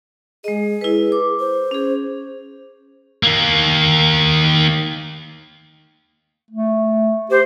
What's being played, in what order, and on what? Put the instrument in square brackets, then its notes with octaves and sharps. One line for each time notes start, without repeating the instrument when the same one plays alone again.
[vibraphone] G#3 D#5 [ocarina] G#4
[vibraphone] E4 B4
D6
[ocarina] C5
[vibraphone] C#4 G#4
[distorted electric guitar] D#3 A#3
[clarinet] A3
[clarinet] G4 [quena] C5